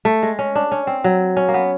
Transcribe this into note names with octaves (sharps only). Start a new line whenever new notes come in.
A3
G#3
C#4
D4
C#4
C4
F#3
C#4
A#3
B3